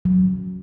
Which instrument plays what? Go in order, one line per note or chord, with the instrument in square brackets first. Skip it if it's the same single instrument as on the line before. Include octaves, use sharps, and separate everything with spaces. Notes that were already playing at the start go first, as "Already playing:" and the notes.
[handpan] F#3